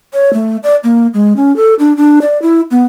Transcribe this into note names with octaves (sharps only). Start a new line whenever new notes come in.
C#5
A3
D5
A#3
G#3
C#4
A4
D4
D4
D5
E4
B3